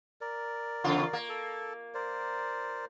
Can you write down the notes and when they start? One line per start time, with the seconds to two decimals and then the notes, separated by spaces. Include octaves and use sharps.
0.21 A#4 D5
0.84 E2 C#3 F4
1.13 A#3
1.29 A4
1.94 A#4 C5 D5